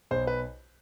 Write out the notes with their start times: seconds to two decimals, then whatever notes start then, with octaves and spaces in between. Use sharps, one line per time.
0.11 B1 C5
0.27 B4